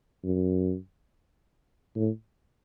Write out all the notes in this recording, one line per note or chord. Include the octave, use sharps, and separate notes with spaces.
F#2
A2